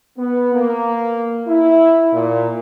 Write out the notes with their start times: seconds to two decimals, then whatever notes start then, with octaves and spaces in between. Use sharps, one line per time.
0.18 B3
0.54 A#3
1.48 E4
2.12 A#2